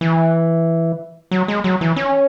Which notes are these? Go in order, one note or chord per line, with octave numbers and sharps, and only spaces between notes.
E3
F#3
G#3
F#3
E3
C#4